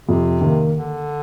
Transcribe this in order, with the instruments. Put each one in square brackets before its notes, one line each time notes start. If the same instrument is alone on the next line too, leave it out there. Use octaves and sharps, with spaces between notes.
[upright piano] F2 [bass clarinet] C3
[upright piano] D#3 A#3
[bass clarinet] D3